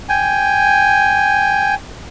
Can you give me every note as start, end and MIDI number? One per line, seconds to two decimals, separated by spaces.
0.09 1.75 79
0.09 1.75 80